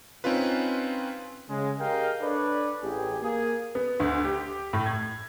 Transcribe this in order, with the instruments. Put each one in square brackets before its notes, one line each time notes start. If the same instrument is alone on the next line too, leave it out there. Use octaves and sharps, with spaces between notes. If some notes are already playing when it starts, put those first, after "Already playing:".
[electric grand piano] C4 C#4 D#4 F4 B4
[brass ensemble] C#3 G#3
G4 G#4 A#4 D#5 F5 G5
D4 A4 B4 C#5 D5
A1 G4 G#4
A#3 G#4
[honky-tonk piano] B3
D2
G4
A2
G#6